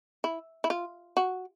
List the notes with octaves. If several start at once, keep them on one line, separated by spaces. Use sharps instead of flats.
E4
E4
F4
F#4